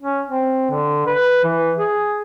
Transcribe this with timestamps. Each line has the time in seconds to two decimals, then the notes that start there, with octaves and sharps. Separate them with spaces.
0.02 C#4
0.29 C4
0.70 D3
1.07 B4
1.44 E3
1.76 G#4